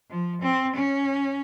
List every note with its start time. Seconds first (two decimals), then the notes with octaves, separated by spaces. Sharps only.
0.10 F3
0.43 C4
0.76 C#4